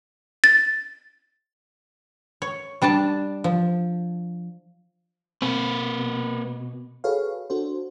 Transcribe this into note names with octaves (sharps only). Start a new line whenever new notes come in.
A6
C#5
G3 D4 D5 A5
F3
B2 A#3 C4 B4
F#4 G#4 A4 B4 C#5 F5
D4 F#4 A4 C5